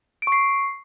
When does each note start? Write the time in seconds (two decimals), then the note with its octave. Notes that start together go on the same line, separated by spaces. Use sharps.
0.22 D7
0.27 C#6
0.32 C7